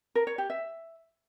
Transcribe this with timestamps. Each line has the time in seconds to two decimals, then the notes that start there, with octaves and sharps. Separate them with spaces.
0.15 A#4
0.27 C#5
0.38 G4
0.50 E5